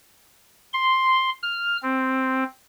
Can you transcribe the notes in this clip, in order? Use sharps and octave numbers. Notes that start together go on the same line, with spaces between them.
C6
F6
C4